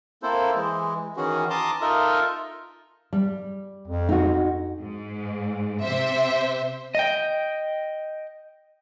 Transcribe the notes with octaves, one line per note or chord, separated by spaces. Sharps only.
A#3 C4 E4 A4 C5
E3 G#3
D#3 E3 C#4 F#4 G#4
A5 A#5 C6 D6 D#6
D#4 F4 A4 A#4 D#5 E5
G3
F2
D#4 F#4
G#2
C3 C5 E5
D#5 G5